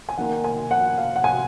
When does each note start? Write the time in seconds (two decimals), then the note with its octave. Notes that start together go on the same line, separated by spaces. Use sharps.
0.09 G#5
0.17 D#3 A#3 F#5
0.44 G#5
0.71 F#5
0.98 F5
1.16 F#5
1.24 G#5